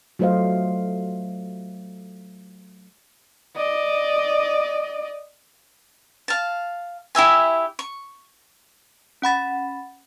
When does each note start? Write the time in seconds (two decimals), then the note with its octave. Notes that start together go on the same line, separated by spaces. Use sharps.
0.19 F#3 A3 F4 C5 D#5 F5
3.56 D5 D#5
6.28 F5 A5
7.15 E4 G4 E5 G#5
7.79 C#6
9.22 C#4 F#5 B5 A6